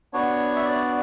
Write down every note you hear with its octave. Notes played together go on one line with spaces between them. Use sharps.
B3 D4 F#4 C#5
E5
D5